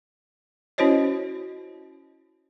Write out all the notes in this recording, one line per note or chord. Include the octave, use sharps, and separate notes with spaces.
C#4 E4 F#4 C5 C#5 D#5